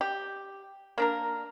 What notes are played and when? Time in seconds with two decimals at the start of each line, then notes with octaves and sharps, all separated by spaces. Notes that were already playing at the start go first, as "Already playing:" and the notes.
0.01 G4
0.98 A#3 D4 A#4